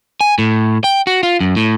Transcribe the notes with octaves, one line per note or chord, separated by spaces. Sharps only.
G#5
A2
G5
F#4
F4
F#2
A2